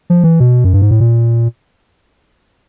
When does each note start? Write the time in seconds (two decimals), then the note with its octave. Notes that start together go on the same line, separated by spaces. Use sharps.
0.10 F3
0.24 E3
0.40 B2
0.64 F#2
0.73 G2
0.82 G#2
0.91 A2
1.00 A#2